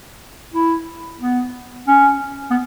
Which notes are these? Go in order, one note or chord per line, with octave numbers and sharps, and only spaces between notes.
E4
B3
C#4
B3